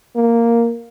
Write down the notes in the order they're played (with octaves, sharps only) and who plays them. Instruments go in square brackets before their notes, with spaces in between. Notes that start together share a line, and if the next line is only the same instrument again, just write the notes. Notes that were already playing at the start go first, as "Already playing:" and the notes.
[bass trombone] A#3